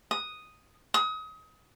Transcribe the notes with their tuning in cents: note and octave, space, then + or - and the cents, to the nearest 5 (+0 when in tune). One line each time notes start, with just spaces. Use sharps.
D#6 +0
D#6 +30